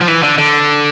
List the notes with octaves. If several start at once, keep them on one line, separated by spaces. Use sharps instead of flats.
F3
E3
D3
D3